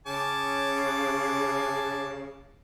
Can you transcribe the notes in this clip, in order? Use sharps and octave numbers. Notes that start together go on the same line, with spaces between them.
C#3 G#5 A5 D6